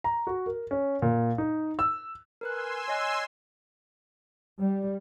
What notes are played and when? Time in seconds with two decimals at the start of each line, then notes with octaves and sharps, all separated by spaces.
0.04 A#5
0.27 F#4
0.46 A#4
0.71 C#4
1.02 A#2
1.38 D#4
1.79 E6
2.41 A#4 B4 G#5 C6 E6 F#6
2.88 C#5 D#5 F#6
4.60 G3